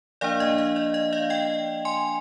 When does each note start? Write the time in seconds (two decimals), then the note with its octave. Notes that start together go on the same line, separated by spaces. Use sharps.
0.21 F3 A#3 D4 D5 F5
0.40 D#5
0.58 D#5
0.76 D5
0.94 D#5
1.13 D5 F5
1.30 D#5 G5
1.85 G#5 C6